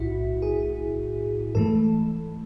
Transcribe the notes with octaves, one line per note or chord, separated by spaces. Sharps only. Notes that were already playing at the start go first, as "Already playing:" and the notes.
Already playing: B1 A2 E4 F#4
G#4
G#2 E3 A3 A4